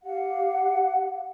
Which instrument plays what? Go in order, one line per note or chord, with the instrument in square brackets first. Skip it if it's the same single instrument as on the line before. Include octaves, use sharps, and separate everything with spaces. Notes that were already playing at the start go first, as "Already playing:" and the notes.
[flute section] G4 F5 F#5